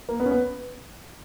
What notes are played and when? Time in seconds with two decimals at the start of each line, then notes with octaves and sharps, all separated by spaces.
0.09 A#3
0.20 B3
0.26 C#4
0.31 B3